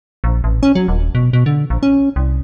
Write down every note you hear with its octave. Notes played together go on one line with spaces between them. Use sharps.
A#1
A1
C#4
F#3
D#1
B2
B2
D3
A#1
C#4
C2